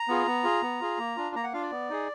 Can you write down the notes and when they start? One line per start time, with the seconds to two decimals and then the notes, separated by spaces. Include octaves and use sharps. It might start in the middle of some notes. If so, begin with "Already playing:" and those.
Already playing: A#5
0.08 B3 F4 G#4
0.27 B3
0.44 F4 G#4
0.62 B3
0.81 F4 G#4
0.98 A#3
1.16 D4 F4
1.35 A#3 A#5
1.44 F#5
1.53 D4 F4 F5
1.62 D5
1.71 B3
1.90 D#4 G#4